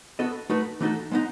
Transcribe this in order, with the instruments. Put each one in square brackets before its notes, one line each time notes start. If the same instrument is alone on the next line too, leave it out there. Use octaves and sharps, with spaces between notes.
[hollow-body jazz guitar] B3 F#4 A4 D#5
A3 D#4 F#4 B4
E3 A3 D#4 F#4 A4
G#3 B3 D#4